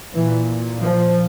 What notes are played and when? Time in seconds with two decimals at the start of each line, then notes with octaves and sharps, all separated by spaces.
0.13 A#2 E3
0.82 F3